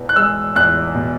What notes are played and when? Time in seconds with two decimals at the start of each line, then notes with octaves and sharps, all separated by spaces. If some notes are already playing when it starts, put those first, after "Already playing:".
Already playing: E2 B2 B3
0.09 F#6
0.16 G#3 E6
0.55 E2 F#6
0.95 B2